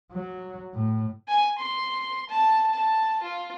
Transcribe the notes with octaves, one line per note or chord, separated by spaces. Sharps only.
F#3
A2
G#5
C6
A5
A5
F4